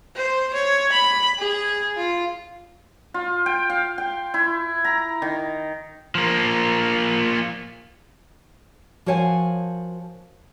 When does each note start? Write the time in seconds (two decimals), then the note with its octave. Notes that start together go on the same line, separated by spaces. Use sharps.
0.15 C5
0.54 C#5
0.92 B5
1.38 G#4
1.97 F4
3.14 F4
3.46 G5
3.70 F5
3.98 G5
4.34 E4
4.85 A#5
5.22 D#3
6.15 F3 A#3
9.06 F3 F#4 A#4 C#5 F5 G#5